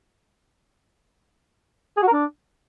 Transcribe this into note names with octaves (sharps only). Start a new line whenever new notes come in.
G#4
F#4
A#4
D4